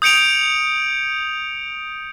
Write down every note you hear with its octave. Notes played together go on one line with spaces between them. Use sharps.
D#6 G6 C#7 D7 F7